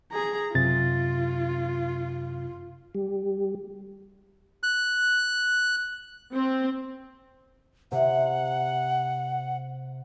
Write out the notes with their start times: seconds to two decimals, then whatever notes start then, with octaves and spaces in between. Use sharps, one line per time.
0.12 G#4 A#5
0.55 F#2 C3 F4 A6
2.95 G3
4.63 F#6
6.32 C4
7.92 C3 F#5